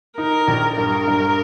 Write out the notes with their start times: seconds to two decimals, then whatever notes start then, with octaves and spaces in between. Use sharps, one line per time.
0.18 D#4 A#4
0.48 A#1
0.77 G2 A#4
1.07 G2